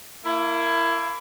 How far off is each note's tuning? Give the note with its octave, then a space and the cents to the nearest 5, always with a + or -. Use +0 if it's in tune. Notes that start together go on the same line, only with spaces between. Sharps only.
A#3 -15 E4 +20